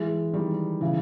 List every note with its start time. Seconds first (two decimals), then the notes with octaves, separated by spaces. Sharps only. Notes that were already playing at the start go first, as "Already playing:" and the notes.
Already playing: E3 G#3
0.33 D#3 G3
0.81 C#3 E3